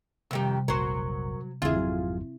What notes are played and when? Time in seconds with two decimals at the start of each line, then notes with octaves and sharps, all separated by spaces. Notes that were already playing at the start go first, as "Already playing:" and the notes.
0.31 F2 C3 D#3 G3 G4
0.68 F1 A#1 F#3 A#4 C5 C#6
1.62 G#1 F2 D3 C4 E4 F4 G#4 E5
1.76 F#3